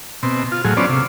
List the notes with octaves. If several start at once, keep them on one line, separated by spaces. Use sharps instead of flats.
B2 C4
F4
A2 F#3 G#4
B3 C#4 F4 C5 D5
C3